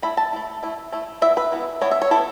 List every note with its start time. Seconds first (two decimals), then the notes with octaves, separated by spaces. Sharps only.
0.02 A3 E4 B5
0.17 A5
0.33 A3 E4
0.63 A3 E4
0.92 A3 E4
1.22 E3 B3 E4 E5
1.37 B4
1.52 E3 B3 E4
1.81 E3 B3 E4 C#5
1.91 E5
2.02 C#5
2.11 E3 B3 E4 A4